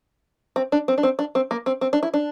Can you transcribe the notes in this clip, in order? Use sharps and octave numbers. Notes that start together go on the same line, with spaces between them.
C4
D4
C4
D4
C4
D4
C4
A#3
C4
C4
D4
E4
D4